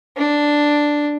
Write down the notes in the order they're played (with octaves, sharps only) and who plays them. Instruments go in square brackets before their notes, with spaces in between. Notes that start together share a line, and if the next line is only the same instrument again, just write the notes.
[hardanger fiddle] D4